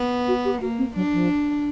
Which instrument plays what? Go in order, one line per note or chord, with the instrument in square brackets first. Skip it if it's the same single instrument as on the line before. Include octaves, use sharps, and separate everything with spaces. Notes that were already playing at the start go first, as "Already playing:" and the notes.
Already playing: [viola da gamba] B3
[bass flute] F#4
G4
[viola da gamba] A#3 [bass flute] F#4
[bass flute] C4
[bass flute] F#3 [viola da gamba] D4
[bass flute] F3